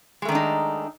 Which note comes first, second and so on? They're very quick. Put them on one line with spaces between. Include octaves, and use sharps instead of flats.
G#3 A3 D#3 D4 D#4